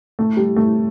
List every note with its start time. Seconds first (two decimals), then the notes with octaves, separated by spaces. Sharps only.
0.19 A3
0.37 G3
0.56 A3